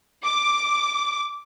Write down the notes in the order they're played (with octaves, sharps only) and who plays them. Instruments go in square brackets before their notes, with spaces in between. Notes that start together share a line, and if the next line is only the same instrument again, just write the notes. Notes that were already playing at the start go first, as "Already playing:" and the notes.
[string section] D6